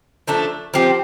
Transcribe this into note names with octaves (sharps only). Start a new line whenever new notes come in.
F3 A3 D4
F3 C4 G4